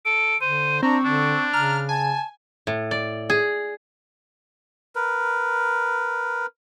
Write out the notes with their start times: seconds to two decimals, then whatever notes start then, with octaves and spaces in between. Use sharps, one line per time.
0.05 A4 D7
0.41 D3 C5 D#7
0.82 C4 D4 A#5 C#6
1.05 D3 D4
1.53 C#3 A#5 F6
1.89 G#5 A5
2.67 A2
2.91 D5
3.30 G#4
4.95 A#4 B4